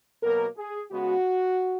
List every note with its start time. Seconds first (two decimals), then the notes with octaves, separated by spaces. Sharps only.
0.22 B2 F#3 A#3 A#4
0.57 G#4
0.91 C#3 G#3 B3 F#4